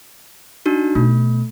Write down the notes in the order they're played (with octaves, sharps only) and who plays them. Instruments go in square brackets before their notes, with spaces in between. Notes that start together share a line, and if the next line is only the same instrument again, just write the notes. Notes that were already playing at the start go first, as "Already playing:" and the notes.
[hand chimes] D4 D#4 F#4
[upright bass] B2 [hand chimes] A3